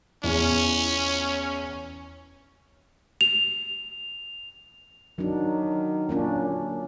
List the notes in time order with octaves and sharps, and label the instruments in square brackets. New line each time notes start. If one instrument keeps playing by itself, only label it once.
[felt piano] E2 [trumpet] C#4
[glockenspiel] F7
[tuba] D#3 [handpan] F#3 D4
[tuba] A#2 [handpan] A#3 C#4 D4